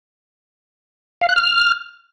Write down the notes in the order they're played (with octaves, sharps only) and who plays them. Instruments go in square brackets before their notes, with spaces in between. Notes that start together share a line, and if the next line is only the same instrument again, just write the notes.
[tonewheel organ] F5
F#6
F6